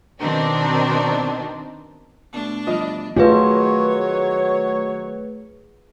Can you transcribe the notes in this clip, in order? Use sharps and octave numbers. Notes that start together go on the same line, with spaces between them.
B2 D#3 C4 D4 D#4
B2 A3 D4
E3 F3 G3 D#5 F6
D#3 F#3 A3 F4 G#4 B4 C#5